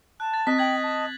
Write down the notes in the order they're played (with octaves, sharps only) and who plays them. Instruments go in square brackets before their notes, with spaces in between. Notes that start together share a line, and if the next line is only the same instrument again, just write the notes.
[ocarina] A5 [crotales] F#6
[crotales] A6
[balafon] C4 [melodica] D#5 [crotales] F#6 B6
[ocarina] G5 [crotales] G#6 F#7
[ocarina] A5